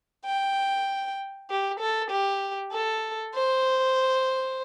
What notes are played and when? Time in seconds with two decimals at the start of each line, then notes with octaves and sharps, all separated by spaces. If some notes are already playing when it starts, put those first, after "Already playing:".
0.25 G5
1.50 G4
1.80 A4
2.11 G4
2.73 A4
3.35 C5